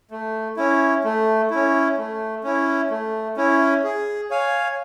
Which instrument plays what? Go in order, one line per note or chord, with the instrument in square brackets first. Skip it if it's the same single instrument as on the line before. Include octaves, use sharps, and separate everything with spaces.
[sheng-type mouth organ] A3
C#4 E4
A3
C#4 E4
A3
C#4 E4
A3
C#4 E4
G#4
C#5 F5 G#5